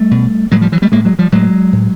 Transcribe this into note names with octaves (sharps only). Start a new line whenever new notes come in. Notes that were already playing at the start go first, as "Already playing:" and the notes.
Already playing: G3 A3
B2
A2 F#3 G#3
F3 G3
E3 F#3
G3 A3
A2 G#3 A#3
F#3 G#3
F3 G3
A2 F#3 G#3
A2